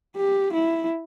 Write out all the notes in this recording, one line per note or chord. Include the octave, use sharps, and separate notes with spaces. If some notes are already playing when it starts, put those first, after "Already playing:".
G4
E4